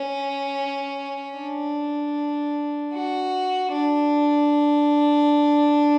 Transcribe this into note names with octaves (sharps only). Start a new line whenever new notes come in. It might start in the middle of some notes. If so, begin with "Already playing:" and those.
Already playing: C#4
D4
F#4
D4